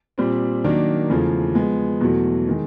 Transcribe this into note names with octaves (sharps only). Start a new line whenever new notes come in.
A#2 G3 C4
D#3 F#3 A#3 D4
E2 C#3 F3 A3
F3 G#3 B3
E2 B2 F#3 A3
D#3 G#3